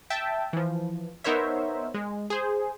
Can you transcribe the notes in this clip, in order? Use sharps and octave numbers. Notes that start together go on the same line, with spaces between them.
E5 G5 A5
E3 F3
B3 D#4 A#4 C5 C#5 E5
G#3
G#4 C5